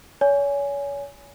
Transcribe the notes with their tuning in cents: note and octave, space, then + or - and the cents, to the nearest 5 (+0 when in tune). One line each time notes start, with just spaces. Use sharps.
C#5 +35 G#5 +0